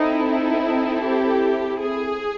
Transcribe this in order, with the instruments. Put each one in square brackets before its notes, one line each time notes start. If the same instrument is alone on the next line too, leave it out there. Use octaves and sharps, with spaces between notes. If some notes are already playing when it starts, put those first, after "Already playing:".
Already playing: [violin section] C4 E4 A4 [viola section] D#4
[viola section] D#4
G4
G#4